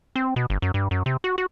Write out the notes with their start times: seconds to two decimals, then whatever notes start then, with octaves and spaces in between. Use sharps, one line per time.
0.16 C4
0.36 B2
0.50 G1
0.62 F#2
0.74 G2
0.91 F#2
1.06 C3
1.24 F#4
1.38 F#4